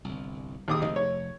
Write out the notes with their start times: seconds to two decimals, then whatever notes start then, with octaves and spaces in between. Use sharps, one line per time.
0.04 G1 C2
0.68 D#2 D6 D#6
0.82 F1 D#4
0.96 C#5